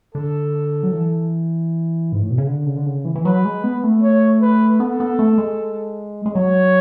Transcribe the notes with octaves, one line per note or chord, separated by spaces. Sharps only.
D3 A4
F#3
E3
G#2
A2
B2
C#3
D3
C#3
D3
C#3
E3
E3
F#3 B4
G#3
B3
A3
C#5
B4
B3 A4
B3
A3
G#3
G#3
F#3 C#5